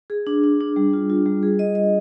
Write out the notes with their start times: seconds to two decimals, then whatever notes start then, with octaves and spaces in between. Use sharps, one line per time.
0.10 G#4
0.27 D4
0.44 D4
0.60 D4
0.76 G3
0.93 F4
1.10 F4
1.26 G3
1.43 G#4
1.59 D#5
1.75 D#5